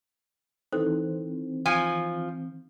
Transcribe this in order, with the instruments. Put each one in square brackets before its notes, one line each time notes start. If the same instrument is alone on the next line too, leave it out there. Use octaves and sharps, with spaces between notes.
[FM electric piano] D#3 E3 C4 [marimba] D#4 A4 F#6
[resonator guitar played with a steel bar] F3 G#5